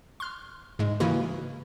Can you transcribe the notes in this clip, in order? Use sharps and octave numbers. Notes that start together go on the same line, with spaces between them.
C6 F6
G#2 G#3
C#3 E3 A#3 E4 F#4